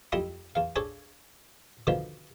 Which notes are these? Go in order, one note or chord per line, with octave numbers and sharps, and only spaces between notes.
F2 G3 E4 D#5 C6 D#6
E2 F5
D4 G#4 A4 C#5
B2 D3 D#3 F3 B3